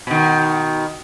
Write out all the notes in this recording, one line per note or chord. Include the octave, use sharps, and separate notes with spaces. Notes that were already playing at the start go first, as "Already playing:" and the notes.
B2 D#3